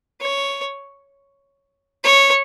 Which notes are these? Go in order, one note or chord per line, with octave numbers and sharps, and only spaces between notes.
C#5
C#5